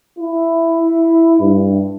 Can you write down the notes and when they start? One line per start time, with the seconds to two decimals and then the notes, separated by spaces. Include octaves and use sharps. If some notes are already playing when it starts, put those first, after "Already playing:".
0.19 E4
1.40 G2